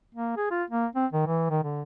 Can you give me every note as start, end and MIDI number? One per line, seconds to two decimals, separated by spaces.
0.15 0.35 58
0.37 0.46 68
0.51 0.63 65
0.71 0.86 58
0.96 1.06 60
1.13 1.25 51
1.27 1.48 52
1.50 1.59 51
1.63 1.82 50